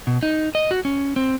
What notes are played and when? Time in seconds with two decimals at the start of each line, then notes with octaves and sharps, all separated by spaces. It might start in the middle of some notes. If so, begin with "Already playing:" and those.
0.07 B2
0.23 D#4
0.55 D#5
0.71 F#4
0.85 C#4
1.16 C4